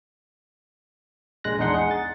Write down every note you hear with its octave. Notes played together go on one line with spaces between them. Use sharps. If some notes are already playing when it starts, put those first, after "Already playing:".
A#1 G#3 F#6 A#6
E2 G#3 D4 D#4 F#5 C6
G#4 F#5
A6